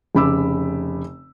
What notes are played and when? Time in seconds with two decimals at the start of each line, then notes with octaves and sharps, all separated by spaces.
0.15 F1 C#3 B5 D6 E6